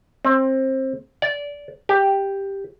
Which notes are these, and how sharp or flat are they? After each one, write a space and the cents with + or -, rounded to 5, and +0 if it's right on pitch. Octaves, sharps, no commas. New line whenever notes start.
C4 +25
D5 -20
G4 +5